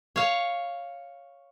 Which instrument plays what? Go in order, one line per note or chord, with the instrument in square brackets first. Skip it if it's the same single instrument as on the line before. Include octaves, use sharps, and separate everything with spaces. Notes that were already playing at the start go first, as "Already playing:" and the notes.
[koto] C#5 F5